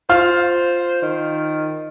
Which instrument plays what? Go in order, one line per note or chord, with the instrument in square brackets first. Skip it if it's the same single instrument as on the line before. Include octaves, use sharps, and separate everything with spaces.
[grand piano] F4 F5 F6 [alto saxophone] C5
[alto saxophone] D#3